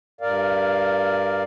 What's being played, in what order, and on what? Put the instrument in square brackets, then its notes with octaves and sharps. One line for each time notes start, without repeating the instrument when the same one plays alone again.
[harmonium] G2 A#4 D5 F5